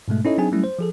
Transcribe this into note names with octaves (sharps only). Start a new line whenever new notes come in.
G#2 B2 G#3 A3
C#4 D#4 E4 A4 C#5 D#5
F#3 C4 D4 D#4 G#4 G#5
F#3 G3 A3 C#4 E4
C5
F3 G#4 A4